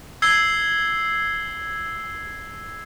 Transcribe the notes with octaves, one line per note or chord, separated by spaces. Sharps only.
E6 G#6 C7 G7